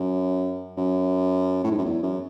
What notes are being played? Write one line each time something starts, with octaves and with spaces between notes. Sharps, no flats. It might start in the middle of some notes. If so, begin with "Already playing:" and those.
Already playing: F#2
F#2
A2
G#2
F#2
E2
F#2